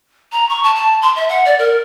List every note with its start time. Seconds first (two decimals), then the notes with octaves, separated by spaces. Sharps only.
0.32 A#5
0.49 C#6
0.64 A5
0.76 A5
1.02 C6
1.16 E5
1.29 F#5
1.45 D5
1.58 A#4